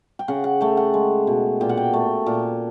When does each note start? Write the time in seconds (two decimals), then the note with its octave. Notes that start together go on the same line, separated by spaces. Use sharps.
0.19 G5
0.28 C#3 F#5
0.44 F#5
0.61 A3 G5
0.77 F#5
0.94 G#3
1.27 B2
1.61 A#2 G5
1.69 F#5
1.77 G5
1.94 A3
2.26 A#2